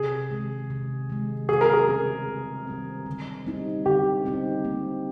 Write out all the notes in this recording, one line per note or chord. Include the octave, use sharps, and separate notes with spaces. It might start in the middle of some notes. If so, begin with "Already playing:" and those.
Already playing: C3 G#4
D#3 G#3
C3
D#3 G#3
C3 G#4
A#4
G#4
D#3 G3 C4
C3
D#3 G3 C4
D3
G3 C4 D#4
D3 G4
G3 C4 D#4
A#3